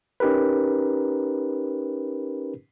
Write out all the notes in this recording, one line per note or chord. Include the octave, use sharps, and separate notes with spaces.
C#4 D#4 G4 A#4 B4